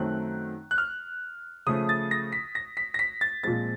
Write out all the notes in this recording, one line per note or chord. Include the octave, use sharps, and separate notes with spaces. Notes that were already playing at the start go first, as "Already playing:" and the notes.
Already playing: F#2 D#3 F#3 A3 C4 F#6
F#6
F6
C#3 F3 A3 D#6
A6
A#6
B6
A#6
B6
A#6
B6
A6
A#2 F3 G#3 C4 A6